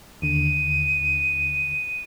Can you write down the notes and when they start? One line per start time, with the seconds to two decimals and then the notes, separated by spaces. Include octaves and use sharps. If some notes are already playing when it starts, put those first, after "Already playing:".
0.22 D#2 D3 D#7